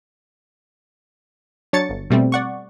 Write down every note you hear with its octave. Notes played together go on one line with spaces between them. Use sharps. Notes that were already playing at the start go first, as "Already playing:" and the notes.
F#3 D4 C#5 A6 C#7
G1
B2 G3 A3 C4
D5 F#5 C#6